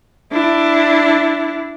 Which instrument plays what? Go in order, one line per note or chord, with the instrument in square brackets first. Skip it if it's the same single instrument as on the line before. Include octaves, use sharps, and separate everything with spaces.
[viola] D4 E4